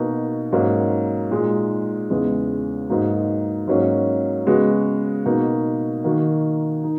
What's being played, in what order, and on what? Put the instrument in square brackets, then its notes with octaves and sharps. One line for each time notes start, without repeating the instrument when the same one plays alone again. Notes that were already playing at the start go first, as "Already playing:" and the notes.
Already playing: [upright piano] B2 A#3 D#4 F#4
G#2 F#3 A#3 C#4
A#2 G#3 D#4
E2 C#3 G#3
G#2 F#3 A#3 D#4 F#4
G#2 F#3 A#3 C#4
C#3 G#3 B3 F#4
B2 A#3 D#4 F#4
D#3 A#3 D#4 F#4
D#4